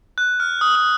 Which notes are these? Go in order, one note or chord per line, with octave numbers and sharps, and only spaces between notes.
F#6
F6
D#6
D#6